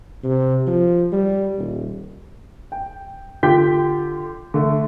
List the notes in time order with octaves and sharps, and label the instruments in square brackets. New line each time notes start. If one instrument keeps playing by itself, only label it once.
[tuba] C3
F3
G3
D#1
[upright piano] G5
D3 F4 G4 G5 G6 B6
D3 A3